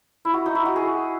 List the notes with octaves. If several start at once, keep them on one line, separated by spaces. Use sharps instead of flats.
E4
F#4
D#4
E4
F#4
G#4